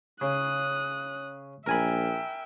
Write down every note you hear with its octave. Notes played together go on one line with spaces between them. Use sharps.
C#3 D#6 F#6
A#1 A#4 E5 G5 G#5 B5